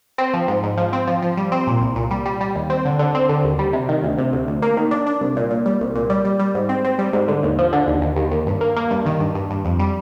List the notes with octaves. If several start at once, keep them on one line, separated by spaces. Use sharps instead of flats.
C4
F3
G#2
G#2
F3
C4
F3
F3
G3
C4
A#2
C2
A#2
G3
G3
G3
D#2
C4
D3
D3
C4
D3
D#2
G3
C3
D#3
D2
C3
D2
D2
A#3
D#3
D4
D4
C2
A#2
A#2
G3
C2
A#2
G3
G3
G3
G#2
C4
C4
G3
G#2
D3
D#2
F3
D3
D#2
D#2
D#2
D#2
G2
A#3
A#3
G2
D#3
G2
G2
G2
F2
G3